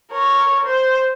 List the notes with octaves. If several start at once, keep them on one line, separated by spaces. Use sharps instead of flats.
A#4 C#5
C5